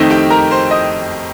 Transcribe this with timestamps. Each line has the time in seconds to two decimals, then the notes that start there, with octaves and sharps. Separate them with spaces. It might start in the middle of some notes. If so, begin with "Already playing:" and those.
Already playing: F2 D#3 A3 C4 D#4 D#5
0.10 G4 G5
0.30 A#4 A#5
0.51 C5 C6
0.71 D#5 D#6